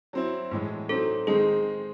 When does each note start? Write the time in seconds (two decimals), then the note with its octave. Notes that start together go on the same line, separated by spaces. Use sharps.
0.13 F#3 C4 E4
0.51 A2 E3 G#3
0.89 F#3 C4 D#4 A4
1.27 D#3 G#3 C4 D#4 G#4